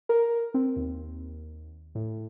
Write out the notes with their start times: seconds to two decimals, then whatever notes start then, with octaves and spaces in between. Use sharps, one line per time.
0.09 A#4
0.54 C4
0.76 D#2
1.95 A2